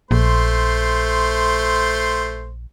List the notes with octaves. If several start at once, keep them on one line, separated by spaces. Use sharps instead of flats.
A#1 A3 C5 C6